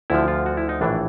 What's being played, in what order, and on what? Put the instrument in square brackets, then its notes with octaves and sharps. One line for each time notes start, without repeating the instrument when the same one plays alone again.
[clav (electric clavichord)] D2 D3 F3 E4
F4
F#4
E4
D#4
A#1 A2 E3 D4